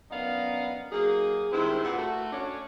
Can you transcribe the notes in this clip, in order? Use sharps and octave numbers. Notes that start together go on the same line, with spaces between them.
F#2 B3 D4 D#4 A#4 F5
F#3 A#3 D#4 G#4
G2 D#3 G#3 C4 E4
A#2 B4 F#5
A3 F#4
C#4 D4 C#5